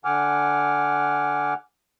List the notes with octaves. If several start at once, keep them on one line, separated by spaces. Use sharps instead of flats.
D3 F#5 G#5 D6 F6